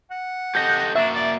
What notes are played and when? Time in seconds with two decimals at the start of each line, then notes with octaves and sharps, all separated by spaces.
0.11 F#5
0.55 G4 A4 D#5 G6 A#6
0.96 A#3 D4 F#4 E5
1.14 D5